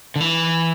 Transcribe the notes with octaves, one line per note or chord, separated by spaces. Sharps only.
D3
E3